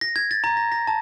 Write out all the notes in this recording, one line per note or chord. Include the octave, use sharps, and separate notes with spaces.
A#6
G#6
A6
A#5
A#6
A#6
A5